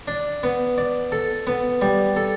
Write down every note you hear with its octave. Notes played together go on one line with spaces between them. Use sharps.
D4
B3
D5
A4
B3
G3
A4